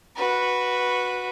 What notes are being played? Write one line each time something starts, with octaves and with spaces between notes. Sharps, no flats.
F#4 B4